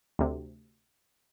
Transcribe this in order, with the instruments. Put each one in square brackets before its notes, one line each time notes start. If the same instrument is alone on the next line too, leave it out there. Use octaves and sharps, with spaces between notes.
[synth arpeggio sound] D2 C3